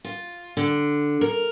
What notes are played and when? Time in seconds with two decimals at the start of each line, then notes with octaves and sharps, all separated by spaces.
0.05 F4
0.57 D3
1.21 A#4